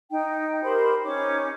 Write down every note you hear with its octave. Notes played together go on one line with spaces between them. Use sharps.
D#4 G5
G4 A#4 C5 B5
C#4 D#4 D6